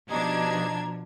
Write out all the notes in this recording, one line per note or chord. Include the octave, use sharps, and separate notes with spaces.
B2 F3 D4 D#4 G4 D#5 A#5 G#6